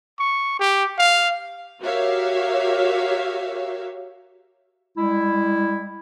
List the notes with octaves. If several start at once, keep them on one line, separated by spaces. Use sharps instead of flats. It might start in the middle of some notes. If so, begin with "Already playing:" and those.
C#6
G4
F5
F#4 G4 A#4 C#5 E5 F5
G3 G#3 E4